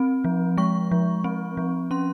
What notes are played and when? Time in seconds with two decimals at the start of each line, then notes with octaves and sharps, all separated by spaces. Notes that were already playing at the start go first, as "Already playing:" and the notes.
Already playing: C4
0.24 F3
0.58 G#3 C#6
0.91 F3
1.24 C4
1.57 F3
1.91 C#4 C6